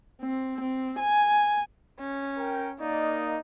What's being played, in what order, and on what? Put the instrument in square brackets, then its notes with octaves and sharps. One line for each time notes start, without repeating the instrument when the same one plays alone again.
[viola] C4
C4
G#5
[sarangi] C#4
[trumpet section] A#4 G5
[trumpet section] A#3 D#5 [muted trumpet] D#4 [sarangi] D5